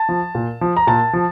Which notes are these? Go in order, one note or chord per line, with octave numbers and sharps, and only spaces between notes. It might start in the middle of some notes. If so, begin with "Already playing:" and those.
Already playing: A5
F3
A#2
F3
A#5
A#2 A5
F3